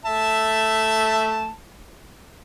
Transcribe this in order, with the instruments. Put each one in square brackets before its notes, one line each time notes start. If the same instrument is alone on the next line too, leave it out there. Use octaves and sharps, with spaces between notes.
[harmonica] A3 E5 A5